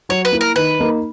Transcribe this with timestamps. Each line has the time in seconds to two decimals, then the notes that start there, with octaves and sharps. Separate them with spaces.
0.09 F#3 C#5
0.25 B4
0.32 A#3 E4
0.41 A#4
0.56 D#3 B4
0.79 A#3 D#4